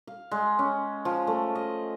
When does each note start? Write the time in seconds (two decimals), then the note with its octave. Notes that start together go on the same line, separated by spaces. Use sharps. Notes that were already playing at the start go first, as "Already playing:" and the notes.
0.07 F5
0.31 G#3
0.59 C#4
1.05 F3
1.27 A3
1.55 D#5